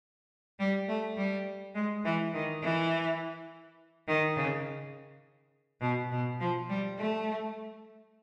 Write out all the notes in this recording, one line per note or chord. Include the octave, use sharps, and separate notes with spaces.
G3
A3
G3
G#3
E3
D#3
E3
D#3
C#3
B2
B2
F3
G3
A3